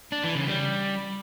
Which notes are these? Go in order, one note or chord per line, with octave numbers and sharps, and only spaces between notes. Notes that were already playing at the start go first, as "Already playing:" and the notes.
D4
E3
C#3
G3